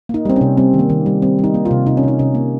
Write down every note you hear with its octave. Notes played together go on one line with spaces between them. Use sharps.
A#3 D#4
G3 C4
C#4
C3
G3 C4
D#3
A#3
D#3
G3
G3 C4
G3
D#4
A#3
F4
C3
C3 D#4
C#4
C3 D#4
C3 C#4
A#3